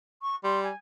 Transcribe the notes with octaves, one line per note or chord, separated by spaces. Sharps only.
C#6
G3 C6
G#5